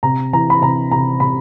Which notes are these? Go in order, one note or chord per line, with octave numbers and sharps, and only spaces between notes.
C3 A#5
E3 A#5
B5
C3 A#5
C3 A#5
C3 B5